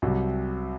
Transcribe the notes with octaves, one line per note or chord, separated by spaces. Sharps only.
C2 C3 F#3